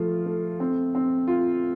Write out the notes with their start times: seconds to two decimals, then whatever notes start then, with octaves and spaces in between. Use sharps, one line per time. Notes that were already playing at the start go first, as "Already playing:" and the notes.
Already playing: F3 A3 F4
0.26 A3
0.60 C4
0.95 C4
1.28 F4